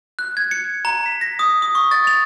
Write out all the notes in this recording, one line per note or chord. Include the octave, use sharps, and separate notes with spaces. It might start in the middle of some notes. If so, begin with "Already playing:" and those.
F#6
G#6
C#7
A#5
B6
A#6
D#6
D#6
C#6
A6
F7